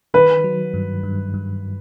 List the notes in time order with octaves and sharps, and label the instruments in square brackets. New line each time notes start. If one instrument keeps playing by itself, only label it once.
[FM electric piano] D#3 [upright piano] B4
[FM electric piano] F#3
G2
G2
G2